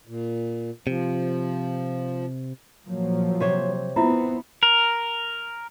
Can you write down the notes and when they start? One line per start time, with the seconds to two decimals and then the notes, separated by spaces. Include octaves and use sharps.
0.07 A#2
0.87 C3 F3
2.86 A#2 F3 F#3 A#3
3.40 C3 C5 C#5
3.96 B3 C4 E4 F4 E5
4.63 A#4